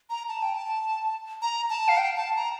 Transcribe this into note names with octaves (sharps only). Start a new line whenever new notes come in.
A#5
A5
G5
A5
A#5
A5
F5
G5
A5
A#5